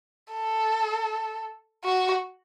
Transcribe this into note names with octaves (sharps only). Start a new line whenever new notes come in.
A4
F#4